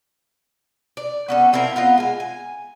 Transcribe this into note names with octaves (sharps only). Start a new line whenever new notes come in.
D5
B3 C#4 A4
F3 C4 E4 A#4
B3 F4 D#5
G#3 G#5
G#5